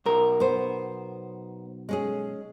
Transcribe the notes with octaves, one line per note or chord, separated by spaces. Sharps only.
B1 A#4
B3 C5
G#3 C#4 G#4